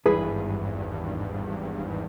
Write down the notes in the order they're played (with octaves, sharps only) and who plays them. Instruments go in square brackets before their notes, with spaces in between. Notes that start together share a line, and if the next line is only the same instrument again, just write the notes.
[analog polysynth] G#1 E2 G2 [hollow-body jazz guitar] E4 G#4 B4